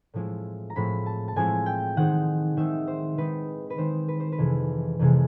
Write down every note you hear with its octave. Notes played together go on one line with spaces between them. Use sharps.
A2 F3 G#3 C4 E4
A#5
A2 F3 G#3 C4 E4 B5
A5
A5
A2 F3 G#3 C4 E4 G#5
G5
D#3 G#3 C4 D#4 F#5
D#3 G#3 C4 D#4 E5
C5
D#3 G#3 C4 D#4 B4
B4
D#3 G#3 C4 D#4 C5
B4
C5
B4
F2 C3 E3 G#3
F2 C3 E3 G#3